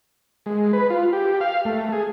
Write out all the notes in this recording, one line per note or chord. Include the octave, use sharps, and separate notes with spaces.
G#3
B4
F4
G4
F5
A3
G#4